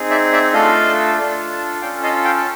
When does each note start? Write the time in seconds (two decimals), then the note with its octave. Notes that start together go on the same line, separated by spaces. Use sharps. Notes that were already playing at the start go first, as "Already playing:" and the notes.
Already playing: C4 D#4 G#4
0.10 D5 E5
0.33 D5 E5
0.53 A3 D4 F4 A4 D#5 F5
1.18 D4 F4 A4
1.82 C#4 F4 A4 F5 G5
2.03 D#5 F5
2.24 F5 G5
2.37 A5